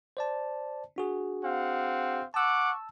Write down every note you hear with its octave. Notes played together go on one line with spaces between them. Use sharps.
C5 D5 A5
D4 F#4 G#4
C4 F5 F#5
F#5 A5 C#6 D6 E6